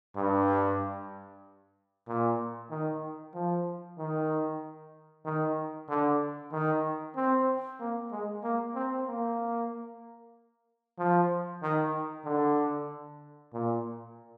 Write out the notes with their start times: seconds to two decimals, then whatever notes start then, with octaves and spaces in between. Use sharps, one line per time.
0.16 G2
2.08 A#2
2.70 D#3
3.34 F3
3.98 D#3
5.25 D#3
5.89 D3
6.52 D#3
7.16 C4
7.80 A#3
8.12 G#3
8.43 A#3
8.75 C4
9.08 A#3
10.99 F3
11.62 D#3
12.25 D3
13.53 A#2